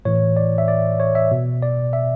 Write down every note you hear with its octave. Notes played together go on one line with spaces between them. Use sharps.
A2 E3 C#5
D5
E5
D5
C#5
E5
B2
D5
E5